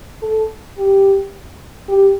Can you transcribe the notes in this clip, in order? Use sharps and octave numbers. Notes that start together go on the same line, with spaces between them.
A4
G4
G4